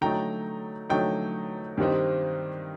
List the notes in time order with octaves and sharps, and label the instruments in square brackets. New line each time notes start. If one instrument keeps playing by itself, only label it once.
[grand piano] D3 F#3 A3 D#4 G5 A#5
D3 F#3 A3 D#4 G5
G2 D#3 G3 C4 D#4